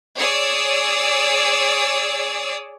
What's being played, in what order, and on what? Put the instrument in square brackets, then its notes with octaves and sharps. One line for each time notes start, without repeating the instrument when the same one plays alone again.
[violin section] G#4 C#5 D5 D#6 E6